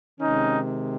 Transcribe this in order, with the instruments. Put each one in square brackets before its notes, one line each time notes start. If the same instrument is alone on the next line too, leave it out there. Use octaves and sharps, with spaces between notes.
[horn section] C3 D#3 G#3 C#4 D#4